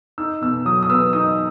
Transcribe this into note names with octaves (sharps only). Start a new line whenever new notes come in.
D#4 E6
B2 E6
F#3 D#6
D#6
B3 E6
D#4 D#6